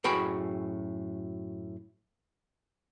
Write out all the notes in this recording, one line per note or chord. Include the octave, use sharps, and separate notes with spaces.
F#2 A2 F#4 G#4 G5 B5